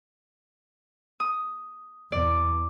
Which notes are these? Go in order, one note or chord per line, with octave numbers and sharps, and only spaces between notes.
D#6
E2 D5